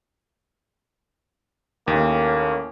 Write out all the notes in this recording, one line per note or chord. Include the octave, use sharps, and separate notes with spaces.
D#2 A2 A#3 C#4